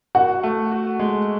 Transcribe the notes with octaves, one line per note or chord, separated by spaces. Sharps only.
F#4 F#5
A3
F#4
G#3